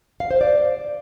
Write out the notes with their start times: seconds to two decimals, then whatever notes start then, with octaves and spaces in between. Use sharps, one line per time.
0.20 F5
0.31 C5
0.41 D5